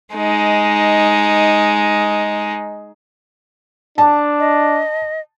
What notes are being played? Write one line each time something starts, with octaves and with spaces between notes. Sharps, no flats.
G#3 D#4
D4 A5
D#5